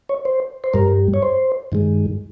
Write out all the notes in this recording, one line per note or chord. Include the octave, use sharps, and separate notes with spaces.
C#5
C5
C5
G2 G3 A#4
C#5
C5
G2 D#3 G#3